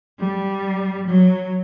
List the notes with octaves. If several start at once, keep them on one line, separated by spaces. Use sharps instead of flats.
G3
F#3